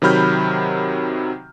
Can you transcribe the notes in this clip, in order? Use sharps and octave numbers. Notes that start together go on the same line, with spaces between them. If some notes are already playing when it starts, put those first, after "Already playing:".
C3 D#3 F#3 B5 F6 G6